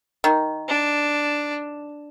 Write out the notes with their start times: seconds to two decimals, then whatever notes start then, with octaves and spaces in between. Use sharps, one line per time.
0.24 D#3
0.68 D4